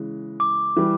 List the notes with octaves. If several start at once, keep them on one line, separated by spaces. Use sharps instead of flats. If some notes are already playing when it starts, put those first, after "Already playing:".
Already playing: C#3 E3 G#3
D6
E3 G3